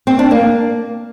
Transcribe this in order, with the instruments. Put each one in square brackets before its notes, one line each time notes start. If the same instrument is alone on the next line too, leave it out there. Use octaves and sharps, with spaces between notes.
[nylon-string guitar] C4
D4
A#3